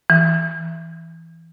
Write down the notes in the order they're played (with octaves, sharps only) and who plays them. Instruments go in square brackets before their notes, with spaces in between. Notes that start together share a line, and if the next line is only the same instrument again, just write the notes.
[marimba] E3